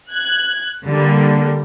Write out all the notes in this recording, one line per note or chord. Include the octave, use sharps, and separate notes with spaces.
F#6 G#6
D3 G3 A#3